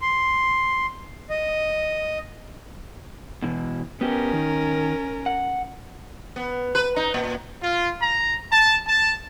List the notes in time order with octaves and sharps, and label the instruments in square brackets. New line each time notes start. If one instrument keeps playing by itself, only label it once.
[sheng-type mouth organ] C6
D#5
[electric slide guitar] B2 E3
[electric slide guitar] B3 G4 [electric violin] C#4 A#4
[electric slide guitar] D#3
F#5
[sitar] B3
B4
D#4
A#2
[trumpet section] F4
A#5
A5
A5